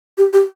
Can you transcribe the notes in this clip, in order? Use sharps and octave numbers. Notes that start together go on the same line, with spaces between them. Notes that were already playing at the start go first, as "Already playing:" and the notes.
G4
G4